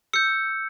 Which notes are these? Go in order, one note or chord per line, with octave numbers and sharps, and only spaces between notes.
E6 G6 C#7